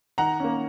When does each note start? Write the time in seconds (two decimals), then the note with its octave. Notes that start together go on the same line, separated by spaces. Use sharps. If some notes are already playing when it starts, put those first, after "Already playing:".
0.18 D#3 F#5 A#5
0.40 A#3 C#4